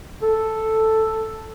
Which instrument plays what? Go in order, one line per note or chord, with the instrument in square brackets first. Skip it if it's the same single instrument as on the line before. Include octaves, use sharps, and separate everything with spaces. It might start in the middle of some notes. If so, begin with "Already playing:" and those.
[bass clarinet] A4